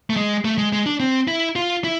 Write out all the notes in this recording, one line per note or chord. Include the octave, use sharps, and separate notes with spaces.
A3
G#3
A3
G#3
G#3
D4
C4
E4
F4
E4